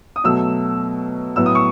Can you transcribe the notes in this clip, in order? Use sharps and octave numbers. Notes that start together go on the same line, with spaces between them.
D#6
B2 F#3 A3 E6
A2 F#3 B3 E6
D#6
C#6